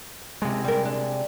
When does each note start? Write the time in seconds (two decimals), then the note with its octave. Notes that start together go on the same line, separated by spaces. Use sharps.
0.42 C3 G#3
0.64 G3 A#4
0.85 D4